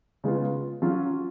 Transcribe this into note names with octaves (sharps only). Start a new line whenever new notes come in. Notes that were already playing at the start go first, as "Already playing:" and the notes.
C#3 G#3 B3 F4
F#3 C#4 F4